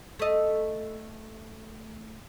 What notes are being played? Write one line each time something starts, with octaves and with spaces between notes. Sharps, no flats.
A3 D#5